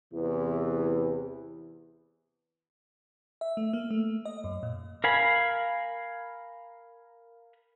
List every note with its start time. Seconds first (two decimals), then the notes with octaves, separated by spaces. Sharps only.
0.14 E2 C3 E3
3.41 E5
3.57 A3
3.73 A#3
3.91 A3
4.25 D#5
4.44 F#2
4.63 A#2
5.04 A#4 F5 G#5 B5